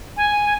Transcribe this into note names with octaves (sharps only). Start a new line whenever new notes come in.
G#5